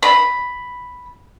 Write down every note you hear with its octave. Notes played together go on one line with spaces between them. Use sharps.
B5